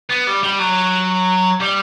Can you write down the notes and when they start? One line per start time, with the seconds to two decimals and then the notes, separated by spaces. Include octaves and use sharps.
0.10 B3
0.27 G3
0.43 G3
0.59 F#3
1.61 G3